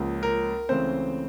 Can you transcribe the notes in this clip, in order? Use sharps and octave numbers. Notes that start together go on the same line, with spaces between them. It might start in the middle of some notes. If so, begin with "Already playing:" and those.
Already playing: C#2 C#3 F3 A#3
A#4
C#2 C#3 E3 A3 C4 C5